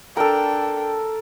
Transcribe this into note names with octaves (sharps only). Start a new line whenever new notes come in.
D4 A4 A#4 G5